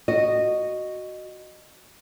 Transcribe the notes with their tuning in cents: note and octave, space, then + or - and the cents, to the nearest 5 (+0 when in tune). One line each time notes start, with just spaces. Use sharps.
F#4 +0 D#5 -15